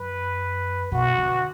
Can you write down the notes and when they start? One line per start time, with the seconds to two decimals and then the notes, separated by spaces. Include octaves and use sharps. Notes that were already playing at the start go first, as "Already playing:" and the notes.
Already playing: F#2 B4
0.92 B2 F#4
1.17 D3